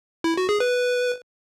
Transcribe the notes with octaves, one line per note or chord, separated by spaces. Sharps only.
E4
F#4
G#4
B4